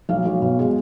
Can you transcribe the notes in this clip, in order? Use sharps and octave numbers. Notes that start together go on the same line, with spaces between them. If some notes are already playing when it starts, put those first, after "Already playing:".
B1 F5
B1
B2
G#3